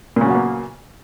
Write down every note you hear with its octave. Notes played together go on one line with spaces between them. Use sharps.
A#2 C#3 F#3 A#3 B3